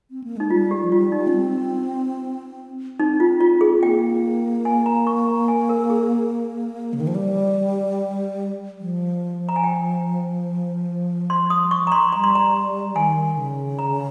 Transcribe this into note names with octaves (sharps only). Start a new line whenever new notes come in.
C4
A#3
G#3 D#4
G3 F4
G4
F3
G3 F4
D#4
C#4
C4
C4 D#4
F4
F4
G#4
A#3 G5
G#5
A#5
C#6
A#5
G#5
A#4
G#4
C#3
D#3
F3
G3
F3
A#5
G#5
G5
C6
D#6
C#6
A#5
C6
G3 A#5
C6
A#5
D#3 G#5
C#3
A#5